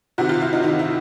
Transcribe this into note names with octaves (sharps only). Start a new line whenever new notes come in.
C3 D#3 F#4
F4
E4
D#4
C3 D#3 D#4
E4